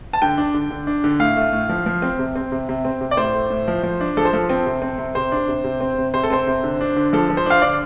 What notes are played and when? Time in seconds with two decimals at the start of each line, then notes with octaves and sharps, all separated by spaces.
0.13 A5
0.22 D3 G5
0.38 D4
0.54 D3
0.70 D3
0.87 D4
1.04 D3
1.20 A2 F5
1.37 A3
1.53 A2
1.69 F3
1.86 F3
2.02 C4
2.19 C3
2.36 C4
2.52 C3
2.69 C3
2.85 C4
3.01 C3
3.11 D5
3.17 A2 C5
3.34 A3
3.50 A2
3.68 F3
3.83 F3
4.01 D4
4.17 F3 A4
4.25 C5
4.33 F3 A4
4.49 C4
4.66 C3
4.82 C4
4.99 C3
5.15 C3 C5
5.32 D4
5.48 C3
5.64 C3
5.81 C4
5.98 C3
6.14 C3 C5
6.23 A4
6.30 C4 C5
6.47 C3
6.64 D3
6.81 D4
6.96 D3
7.13 F3 A4
7.30 F3
7.37 C5
7.46 D4 F5
7.62 D3 D5